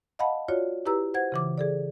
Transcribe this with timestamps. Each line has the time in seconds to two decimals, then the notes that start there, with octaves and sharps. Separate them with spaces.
0.19 D#5 F5 F#5 A5 B5
0.48 F4 F#4 C#5 D5
0.86 E4 G4 B4 A#5 E6
1.14 C5 F#5 G#6
1.32 C#3 E3 D6
1.58 G#4 A4 D5